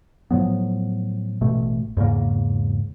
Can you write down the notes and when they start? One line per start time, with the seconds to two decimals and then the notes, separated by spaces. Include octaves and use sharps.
0.31 A2 F3 F#3 B3
1.41 A1 B2 A3
1.97 E2 G#2 C#3 A#3